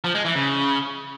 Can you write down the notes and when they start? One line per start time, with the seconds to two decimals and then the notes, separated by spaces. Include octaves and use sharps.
0.04 F3
0.15 G#3
0.25 E3
0.35 C#3